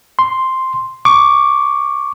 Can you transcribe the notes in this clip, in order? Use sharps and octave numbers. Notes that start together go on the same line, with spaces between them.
C6
C#6 D6